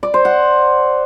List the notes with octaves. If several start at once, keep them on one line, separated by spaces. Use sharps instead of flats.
D5
C5
F#5